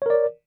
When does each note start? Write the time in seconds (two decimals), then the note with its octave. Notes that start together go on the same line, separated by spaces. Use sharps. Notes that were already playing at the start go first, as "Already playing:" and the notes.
0.02 C#5
0.06 A#4
0.10 D5